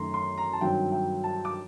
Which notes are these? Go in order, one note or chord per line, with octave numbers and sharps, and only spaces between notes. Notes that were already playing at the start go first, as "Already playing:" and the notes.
Already playing: F#2 D#3 A3 A#5 C6
C6
A#5
A5
G2 D#3 F#3 C4 G5
G5
A5
D6